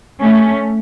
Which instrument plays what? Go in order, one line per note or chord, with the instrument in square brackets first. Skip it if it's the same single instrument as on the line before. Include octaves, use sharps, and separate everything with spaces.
[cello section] A3 C#4